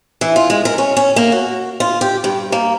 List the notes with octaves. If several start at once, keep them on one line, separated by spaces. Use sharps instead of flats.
E3
F4
G#3
A#4
C#4
C#4
A#3
F#4
F4
G4
G2
A#3